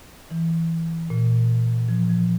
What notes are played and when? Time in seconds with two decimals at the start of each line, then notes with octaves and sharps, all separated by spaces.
0.31 E3
1.10 A#2
1.89 F3
2.09 F3